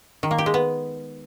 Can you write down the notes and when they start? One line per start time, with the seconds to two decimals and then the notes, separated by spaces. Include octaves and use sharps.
0.23 D#3
0.31 A#3
0.38 G4
0.46 G#3
0.54 B3